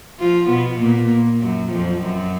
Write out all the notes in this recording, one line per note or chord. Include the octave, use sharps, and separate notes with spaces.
F3 F4
B2 B3
A#2 A#3
F#2 F#3
F2 F3
F#2 F#3